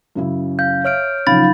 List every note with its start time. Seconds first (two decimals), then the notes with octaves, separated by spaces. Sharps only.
0.15 F#2 C#3 E4
0.59 F5 G6
0.84 C#5 E5 F6 D7
1.27 C#3 F3 F#3 D#4 F5 B5 A6